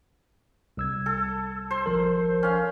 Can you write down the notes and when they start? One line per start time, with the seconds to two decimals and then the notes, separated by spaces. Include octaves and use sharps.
0.77 C2 E6 G#6
1.06 A4
1.71 C5
1.86 G#1 F3 A#4
2.43 C#4 F5